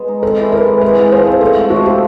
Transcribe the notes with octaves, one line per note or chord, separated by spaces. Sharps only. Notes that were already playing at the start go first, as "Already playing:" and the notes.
Already playing: B2 G#3
D#4
C4 A4
E3
G#3 A#4
E3
G#3 B4
G#2
F3 C5
C4 B4
A3 A4
G#2
F3 F#4
C4 G4